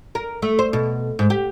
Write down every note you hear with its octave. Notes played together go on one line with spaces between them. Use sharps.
A#4
A3
C5
B2
G#2
G4